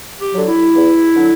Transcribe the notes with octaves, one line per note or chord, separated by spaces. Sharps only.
G4
D3 F#3
E4
E2
D3 F#3